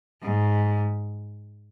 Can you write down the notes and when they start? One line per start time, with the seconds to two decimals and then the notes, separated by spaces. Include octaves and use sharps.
0.23 G#2